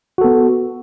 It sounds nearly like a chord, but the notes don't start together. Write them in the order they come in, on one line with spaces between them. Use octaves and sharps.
F#4 A4 B3